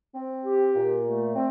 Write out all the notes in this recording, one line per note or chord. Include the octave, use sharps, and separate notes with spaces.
C4
G4
A#2
A3
C4